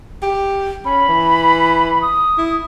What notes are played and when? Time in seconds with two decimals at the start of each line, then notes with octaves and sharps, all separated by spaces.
0.23 G4
0.85 C#4 B5
1.08 E3
2.02 D#6
2.38 E4